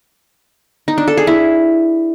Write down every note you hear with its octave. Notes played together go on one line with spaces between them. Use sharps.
D#4
D4
A4
G#4
E4